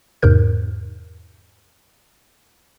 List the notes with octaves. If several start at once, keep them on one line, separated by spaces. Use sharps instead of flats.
E2 G#2 C3 A#4 G6